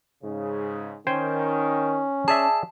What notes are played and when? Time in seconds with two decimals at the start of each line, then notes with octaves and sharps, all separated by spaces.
0.24 G#2 C#3
1.07 D#3 C#4 C5 G5 G#5
2.28 G#4 D5 E5 A5